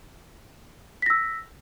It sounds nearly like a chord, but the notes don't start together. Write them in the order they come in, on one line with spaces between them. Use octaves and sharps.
B6 A#6 E6